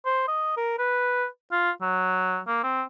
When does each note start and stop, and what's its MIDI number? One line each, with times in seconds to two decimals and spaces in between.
0.05 0.24 72
0.28 0.52 75
0.57 0.77 70
0.78 1.26 71
1.52 1.71 65
1.81 2.39 54
2.47 2.62 58
2.64 2.83 60